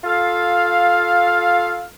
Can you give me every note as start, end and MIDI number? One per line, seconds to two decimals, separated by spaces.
0.04 1.89 65
0.04 1.89 69
0.04 1.89 77